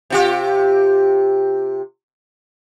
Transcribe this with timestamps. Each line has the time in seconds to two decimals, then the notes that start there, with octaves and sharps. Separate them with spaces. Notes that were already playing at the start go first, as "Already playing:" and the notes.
0.10 C3 F4 G4